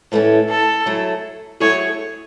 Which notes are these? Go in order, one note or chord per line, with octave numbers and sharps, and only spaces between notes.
A2 E3 A3 C#4
A4
F#3 A3 E4 G#4
F#3 A3 E4 G#4 C#5